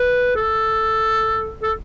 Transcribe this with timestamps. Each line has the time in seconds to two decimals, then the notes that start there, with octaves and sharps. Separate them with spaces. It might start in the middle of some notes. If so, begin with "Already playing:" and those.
Already playing: B4
0.36 A4
1.63 A4